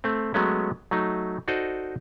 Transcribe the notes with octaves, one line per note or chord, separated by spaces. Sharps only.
A3 C4
F#3 G#3 A3 B3 C#4
F#3 A3 D#4
D#4 F#4 A4 C5 D5 D#5